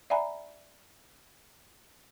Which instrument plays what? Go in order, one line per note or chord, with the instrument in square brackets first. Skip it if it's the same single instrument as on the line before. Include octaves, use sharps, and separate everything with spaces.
[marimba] D5 E5 F#5 G#5 A#5 B5